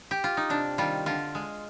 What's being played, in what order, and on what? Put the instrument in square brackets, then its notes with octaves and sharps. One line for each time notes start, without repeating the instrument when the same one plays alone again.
[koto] G4
F4
D#4
C3 D4
D#3 G3 F4
D3 F4
G#3